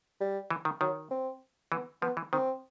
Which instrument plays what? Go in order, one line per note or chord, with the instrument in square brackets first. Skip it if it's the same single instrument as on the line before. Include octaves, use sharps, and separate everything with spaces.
[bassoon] G3
[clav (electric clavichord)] E3
D#3
[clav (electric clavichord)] D#3 [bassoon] F#3
[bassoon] C4
[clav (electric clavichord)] E3 [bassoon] B3
[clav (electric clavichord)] F3 [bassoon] B3
[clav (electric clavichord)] E3
[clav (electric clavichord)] D#3 [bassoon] C4